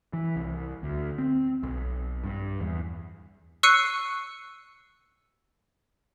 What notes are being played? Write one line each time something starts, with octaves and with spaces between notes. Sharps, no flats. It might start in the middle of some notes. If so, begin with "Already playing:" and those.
E3
C2
D2
C4
B1
G2
E2
C#6 E6 F#6 C7 C#7 D#7